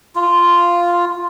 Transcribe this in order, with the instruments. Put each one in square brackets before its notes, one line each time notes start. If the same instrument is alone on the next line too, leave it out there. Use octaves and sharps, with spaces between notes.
[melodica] F4